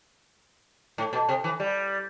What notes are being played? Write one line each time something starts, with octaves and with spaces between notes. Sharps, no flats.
A2
B2
C3
E3
G3